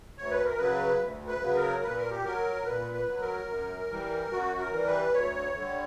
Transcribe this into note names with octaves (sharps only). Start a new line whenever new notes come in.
D2 C#5
B4
A#4
C#3 F#3 B4
D2
B4
C#3 F#3
A#4
A#2 B4
A#4
G4
F#3 A#4
A#2 B4
B4
F#3
A#4
F#2
E3 G3
F#2 F#4
A#4
E3 G3
B4
D2 C#5
D3 G3